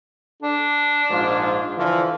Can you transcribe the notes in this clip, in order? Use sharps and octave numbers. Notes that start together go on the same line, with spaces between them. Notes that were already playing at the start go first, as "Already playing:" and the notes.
D4
A#1 G#2 F4
D3 E3 F3